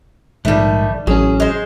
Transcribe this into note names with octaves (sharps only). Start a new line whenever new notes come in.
A#1 G#2 D#3 G3 A3
A1 F#3 C#4 G#4
G#3 C5